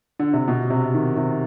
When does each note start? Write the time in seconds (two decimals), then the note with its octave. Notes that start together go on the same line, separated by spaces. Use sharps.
0.19 D3
0.33 C3
0.48 B2
0.70 C3
0.94 D#3
1.17 C3